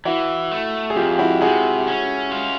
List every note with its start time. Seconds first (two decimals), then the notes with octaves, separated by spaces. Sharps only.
0.05 E3 E4 F#4
0.52 A3
0.90 G#4
0.96 F2 F4 G4
1.19 E4 F#4
1.41 C3 F#4 G#4
1.87 C#4
2.32 F4